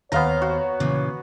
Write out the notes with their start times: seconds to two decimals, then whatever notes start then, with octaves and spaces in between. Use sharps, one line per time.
0.12 D#2 B3 C5 C#5 F5 A#5
0.42 F#4
0.80 A#2 C#3 E3